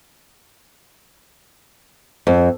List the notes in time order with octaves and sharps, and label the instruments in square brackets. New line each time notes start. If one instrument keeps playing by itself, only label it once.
[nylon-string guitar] F2